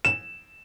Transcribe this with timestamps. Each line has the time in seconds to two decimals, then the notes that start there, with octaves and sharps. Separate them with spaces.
0.05 E7